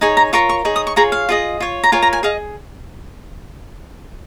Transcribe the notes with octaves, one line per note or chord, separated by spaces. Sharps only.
D#4 G#4 C#5 G#5
A#5
F4 A#4 C#5 C#6
C#6
D#4 G#4 C#5
D#6
C#6
F4 G#4 C#5 A#5
F5
F4 G#4 D#5
F4 C#5
A#5
F4 A#4 C#5 G#5
A#5
G#5
G#4 D#5 F5